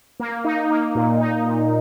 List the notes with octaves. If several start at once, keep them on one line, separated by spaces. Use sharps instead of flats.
A#3
D#4
A#3
A#2
D#4
A#2